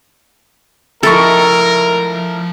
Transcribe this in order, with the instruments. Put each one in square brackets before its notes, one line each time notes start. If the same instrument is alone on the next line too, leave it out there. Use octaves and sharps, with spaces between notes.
[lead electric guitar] F3 E5 [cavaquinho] E4 D#5 C#6 [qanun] A4 [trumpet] A#4